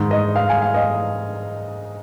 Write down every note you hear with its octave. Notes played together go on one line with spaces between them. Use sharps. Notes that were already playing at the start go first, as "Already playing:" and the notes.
Already playing: G#2 D#3
D#5
F5
G#5
F5
D#5